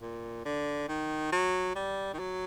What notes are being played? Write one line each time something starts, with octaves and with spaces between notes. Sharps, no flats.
A#2
D3
D#3
F#3
G3
D#3
F#3